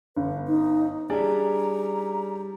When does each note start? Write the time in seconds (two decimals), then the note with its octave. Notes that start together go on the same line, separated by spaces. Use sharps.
0.16 G1 B4
0.47 D#4
1.10 G3 C#4 D4 E4 G#4 D5 A#5